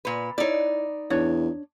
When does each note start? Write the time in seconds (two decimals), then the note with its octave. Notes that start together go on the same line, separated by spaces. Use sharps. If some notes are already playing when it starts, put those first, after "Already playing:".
0.05 A#2 B4
0.38 D#4 E4 C#5 D5
1.10 E2 D4 C#5